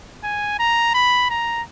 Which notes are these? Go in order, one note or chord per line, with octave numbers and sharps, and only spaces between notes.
G#5
A#5
B5
A#5